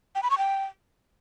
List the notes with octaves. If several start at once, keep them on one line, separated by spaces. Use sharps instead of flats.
G5
B5
C#6
G5